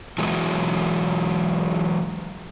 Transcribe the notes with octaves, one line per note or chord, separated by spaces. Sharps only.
E3 F#3 G#3